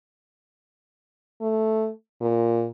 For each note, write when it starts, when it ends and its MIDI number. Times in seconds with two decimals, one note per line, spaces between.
1.41 1.89 57
2.21 2.66 46